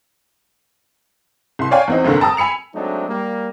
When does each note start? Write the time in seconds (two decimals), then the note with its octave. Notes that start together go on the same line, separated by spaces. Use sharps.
1.59 C2 C6
1.71 C#5 D5 F5 G5 G#5
1.88 E2 C4 D#4
2.05 F1 D#2 G#2 D3 D#3
2.20 G5 A5 A#5 D#6 E6
2.37 G#5 B5 C#7 F7
2.74 F#3 G#3 A3 C4 D4 D#4
3.08 G3 A#3